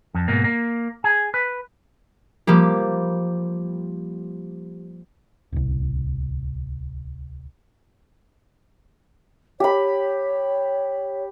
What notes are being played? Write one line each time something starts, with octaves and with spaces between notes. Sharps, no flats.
F2
G#2 B2 A#3
A#3
G#4
B4
F3 G3 A#3 G4
D1 C2
G4 C#5 B5